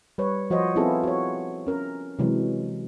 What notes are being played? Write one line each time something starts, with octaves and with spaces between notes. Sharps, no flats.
G3 B4 C#5
F3 F#4 C5 C#5 D#5
B3 C4 E4 F4 G#4 A4
F#4 C#5
C#4 A#4
C3 E3 F#3 G#3